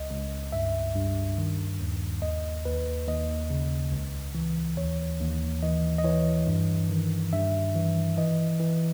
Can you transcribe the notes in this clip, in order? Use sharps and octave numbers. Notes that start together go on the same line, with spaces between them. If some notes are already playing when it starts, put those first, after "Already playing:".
Already playing: C#2 D#5
C#2
G2 E5
G2
D#3
D#2
D#2 D#5
D#2 B4
D#2 D#5
C#3
C#2
E3
D#2 C#5
D#2
E3 D#5
D#5
E3 C#5
G2
D#3
G2 E5
E3
E3 D#5
E3